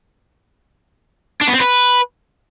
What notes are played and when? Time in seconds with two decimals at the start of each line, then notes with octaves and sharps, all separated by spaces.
1.41 D4
1.48 B3
1.54 C4
1.60 B4